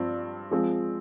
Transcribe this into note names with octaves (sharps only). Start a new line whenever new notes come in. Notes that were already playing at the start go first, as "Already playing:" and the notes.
Already playing: G2 F3 C4
F3 G#3 C4